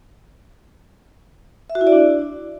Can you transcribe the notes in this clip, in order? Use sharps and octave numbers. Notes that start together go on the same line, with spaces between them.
E5
F#4
E4
D5
D4